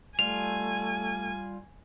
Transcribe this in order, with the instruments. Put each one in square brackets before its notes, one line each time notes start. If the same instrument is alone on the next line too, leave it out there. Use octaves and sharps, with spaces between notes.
[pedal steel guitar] G3 F4 [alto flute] A3 [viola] G#5 [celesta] F7